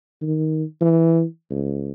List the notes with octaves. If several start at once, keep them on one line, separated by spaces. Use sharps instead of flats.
D#3
E3
C#2